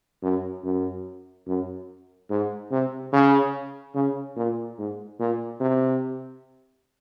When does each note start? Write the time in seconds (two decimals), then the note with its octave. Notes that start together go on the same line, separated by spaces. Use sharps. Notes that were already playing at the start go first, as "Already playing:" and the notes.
0.23 F#2
0.64 F#2
1.47 F#2
2.30 G#2
2.71 C3
3.13 C#3
3.95 C#3
4.36 A#2
4.78 G#2
5.19 A#2
5.60 C3